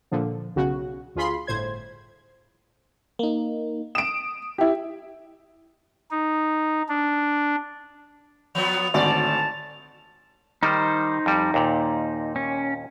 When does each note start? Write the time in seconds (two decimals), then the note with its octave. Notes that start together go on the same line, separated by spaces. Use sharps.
0.11 A#2 D3 F3
0.56 B1 C#3 F#4
1.16 D2 F4 G#4 B5 C6
1.47 G1 A2 C5 G#6
3.19 A#3 D#4
3.95 D#6 D7 E7
4.58 E4 G4
6.11 D#4
6.89 D4
8.55 F3 F#3 B3 F7
8.94 G#1 D2 A2 F#4 D5 A5
10.63 D#3 G3 D#4 C5
11.26 F2 G3
11.54 D#2 A#2
12.36 C#4